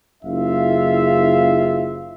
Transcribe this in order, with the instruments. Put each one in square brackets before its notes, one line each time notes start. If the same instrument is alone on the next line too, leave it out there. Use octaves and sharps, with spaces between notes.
[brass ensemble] F#1 C#3 E4 F4 E5 F5